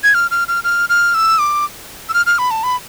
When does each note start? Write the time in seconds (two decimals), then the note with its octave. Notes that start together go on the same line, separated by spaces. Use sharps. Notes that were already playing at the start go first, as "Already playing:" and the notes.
0.04 G#6
0.14 F6
0.31 F6
0.48 F6
0.64 F6
0.89 F6
1.14 E6
1.39 D6
2.09 E6
2.14 F6
2.26 F6
2.39 B5
2.51 A5
2.63 B5